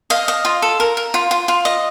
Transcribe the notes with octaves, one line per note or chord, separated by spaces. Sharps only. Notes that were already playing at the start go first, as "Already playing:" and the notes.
D#5 F5
D#5
F4
A4
A#4
A#4
F4
F4
F4
D#5